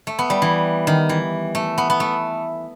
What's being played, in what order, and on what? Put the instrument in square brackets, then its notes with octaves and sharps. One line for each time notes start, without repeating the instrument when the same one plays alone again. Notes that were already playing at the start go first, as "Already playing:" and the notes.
[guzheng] A3
B3
G3
E3
D#3
E3
A3
B3
B3
A3